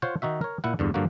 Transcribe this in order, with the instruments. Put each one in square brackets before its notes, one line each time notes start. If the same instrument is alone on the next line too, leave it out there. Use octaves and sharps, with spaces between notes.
[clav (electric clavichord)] F4 C5 C#5 F#5
D#3 D#4 F#4 E5
A#4 C#5
A#2 E4 F#5
E2 G2 D3
G2 D3 F3 A#3 F#4